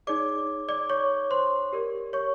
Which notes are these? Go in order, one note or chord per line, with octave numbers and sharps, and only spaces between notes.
D#4 G#4 C#5 D5 D6
D5 D6
C#5 C#6
C5 C6
G4 A#4 D5
C#5 C#6